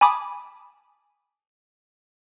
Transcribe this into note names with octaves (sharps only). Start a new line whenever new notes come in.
G#5 A5 B5 D6 D#6